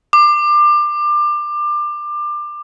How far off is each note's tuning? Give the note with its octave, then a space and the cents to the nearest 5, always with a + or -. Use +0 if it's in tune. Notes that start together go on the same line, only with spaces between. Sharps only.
D6 +25